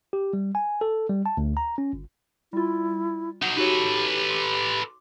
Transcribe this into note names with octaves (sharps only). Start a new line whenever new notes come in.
G4
G3
G#5
A4
G3
A5
D2
A#5
C#4
G1
G3 E4 F4
F#3 D#4 F#5
D#4 F#4 G4 A4 B4 C#5
C6 D6